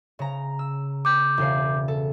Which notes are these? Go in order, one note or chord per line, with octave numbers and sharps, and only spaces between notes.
C#3 A#5
E6
D6 G6
E1 C#3 C7
A4